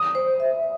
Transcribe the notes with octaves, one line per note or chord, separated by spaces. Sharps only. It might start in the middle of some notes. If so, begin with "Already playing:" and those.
Already playing: D#6
C5
E5